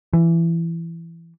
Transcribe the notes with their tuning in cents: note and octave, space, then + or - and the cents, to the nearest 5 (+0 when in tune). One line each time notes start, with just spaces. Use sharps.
E3 +20